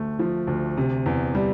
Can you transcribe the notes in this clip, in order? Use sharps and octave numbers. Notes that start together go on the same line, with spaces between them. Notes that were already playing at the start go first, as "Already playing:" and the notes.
Already playing: D2 A3
F3
D2
C3
E2
G3